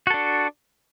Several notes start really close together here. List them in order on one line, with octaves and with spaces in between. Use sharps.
F#4 A4 D4